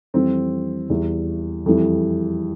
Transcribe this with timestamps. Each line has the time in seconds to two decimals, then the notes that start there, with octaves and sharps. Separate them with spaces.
0.14 F2 E3 G3 C4
0.90 E2 E3 G3
1.66 F2 E3 G3